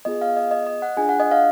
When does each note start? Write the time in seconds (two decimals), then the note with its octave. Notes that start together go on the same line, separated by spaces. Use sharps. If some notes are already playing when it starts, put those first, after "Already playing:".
0.05 B3 F4 G#4 D#5
0.22 F5
0.36 D#5
0.51 D#5
0.67 D#5
0.82 F#5
0.97 D4 F4 G#4 G#5
1.09 F#5
1.20 D#5
1.31 F5